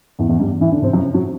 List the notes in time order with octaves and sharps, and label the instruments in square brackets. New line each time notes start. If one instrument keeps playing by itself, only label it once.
[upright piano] E2 E3
E2 E3
G2 G3
E3 E4
D3 D4
C3 C4
F#2 F#3
F#3